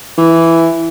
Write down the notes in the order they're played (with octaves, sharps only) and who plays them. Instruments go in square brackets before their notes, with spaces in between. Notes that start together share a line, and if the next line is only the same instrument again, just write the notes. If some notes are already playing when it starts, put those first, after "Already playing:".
[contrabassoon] E3